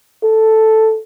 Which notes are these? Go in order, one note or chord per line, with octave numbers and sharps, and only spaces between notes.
A4